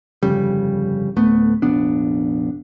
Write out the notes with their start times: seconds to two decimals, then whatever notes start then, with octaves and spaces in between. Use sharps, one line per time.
0.23 G1 F2 C#3 G3
1.16 D1 A3 B3
1.62 F1 A#1 B3 D4